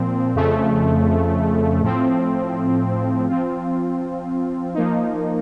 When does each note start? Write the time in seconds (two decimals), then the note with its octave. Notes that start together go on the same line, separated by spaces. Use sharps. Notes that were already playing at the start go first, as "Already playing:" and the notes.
Already playing: A#2 F3 C4
0.35 F2 C#3 F3 A3
1.82 A2 F3 C4
3.28 F3 C4 F4
4.75 F3 A#3 D#4